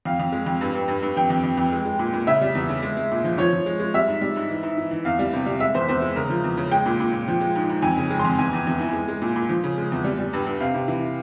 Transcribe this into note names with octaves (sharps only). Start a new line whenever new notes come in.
F2 F5
F2
G#3
F2
G2
G2
G2
G2
F2 G5
F2
F2
F2
G#3
G#3
A#2
A#2
C#3 E5
G3
E2
C#3
G#3
G#3
A#2
F3
F3 C#5
F3
G#3
G#3
G3 E5
G#2
G3
G#2
E3
G#2
E3
E3
E2 F5
G3
C3
G3
G#3 E5
E2 C5
E2 C5
G#3
C#3 A#4
F3
E2
C#3
G#3 G5
A#2
A#2
A#2
F3
G#3
G#2
G#2
F2 G#5
C#3
G#3
C6
F2
E2 G#5
E2
E2
E3
G#3
G#3
A#2
A#2
F3
C#3
G#3
E2
G3
G3
G2
G2
C3 F5
C3
E3